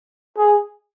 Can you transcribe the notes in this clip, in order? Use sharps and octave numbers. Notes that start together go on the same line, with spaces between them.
G#4